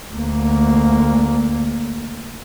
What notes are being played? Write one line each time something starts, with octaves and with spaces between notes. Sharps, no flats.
D2 A#3